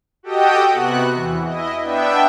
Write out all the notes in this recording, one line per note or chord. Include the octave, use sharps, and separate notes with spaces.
F#4 G4 A4 D#5 G5 D#6
C3 B3 F#4 F#6
E2 E3
E4 D#5
B3 D4 E5 G5